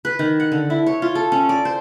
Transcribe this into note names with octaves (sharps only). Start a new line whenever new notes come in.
B4
D#3
F#5
D3
E4
C#5
F4
A4
C#4
D5
C5